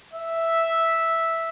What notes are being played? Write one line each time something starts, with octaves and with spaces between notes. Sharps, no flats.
E5